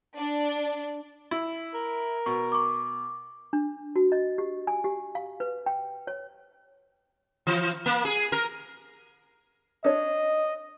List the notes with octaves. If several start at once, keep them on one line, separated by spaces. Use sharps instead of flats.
D4
E4
A#4
B2 C#6
C#6 D6
D4
F#4
D#5
G4
G#5
G4
F5
B4
G5
C#5
E3
A#3
G#4
A#4
D4 C#5 D#5